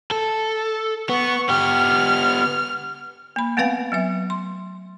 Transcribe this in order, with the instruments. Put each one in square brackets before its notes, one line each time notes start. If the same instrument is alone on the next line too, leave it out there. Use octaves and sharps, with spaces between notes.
[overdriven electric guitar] A4
[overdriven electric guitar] B3 [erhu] C#6
[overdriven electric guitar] B3 G4 [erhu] F6
[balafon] A#3 B5
A3 B3 C4 B4 F5 G5
F#3 B3 E5
C6